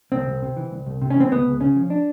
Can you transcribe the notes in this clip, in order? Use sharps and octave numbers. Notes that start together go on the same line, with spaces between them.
C2 C4
C2
C3
E3
C2
C2
C3
C#4
E3 C4
C#2 B3
C#2
C#3 C#4
F3
D4